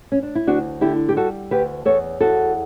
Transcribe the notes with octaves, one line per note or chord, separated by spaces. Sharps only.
C#4
D4
E4
D2 D4 F#4
D3 E4 G4
G4
G3 F#4 A4
D2 G4 B4
E2 A4 C#5
E2 F#4 A4